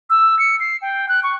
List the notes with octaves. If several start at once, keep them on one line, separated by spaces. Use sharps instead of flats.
E6
C#7
C7
G5
F#6
C#6